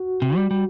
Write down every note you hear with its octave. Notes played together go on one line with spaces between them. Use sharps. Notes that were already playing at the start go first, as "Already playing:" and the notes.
Already playing: F#4
C3
G3
G3